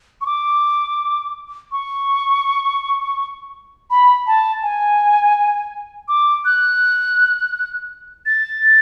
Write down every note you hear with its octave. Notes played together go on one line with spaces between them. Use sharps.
C#6
D6
C#6
B5
A5
G#5
D6
F#6
A6